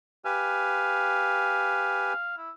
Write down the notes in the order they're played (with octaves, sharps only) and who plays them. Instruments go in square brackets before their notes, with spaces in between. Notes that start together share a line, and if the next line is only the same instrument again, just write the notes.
[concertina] G4 B4 G#5 [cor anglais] F5
[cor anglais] E4